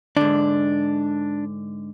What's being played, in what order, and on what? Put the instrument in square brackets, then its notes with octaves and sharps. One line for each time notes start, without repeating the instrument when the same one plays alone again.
[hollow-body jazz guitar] G#2 D3 [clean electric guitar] D4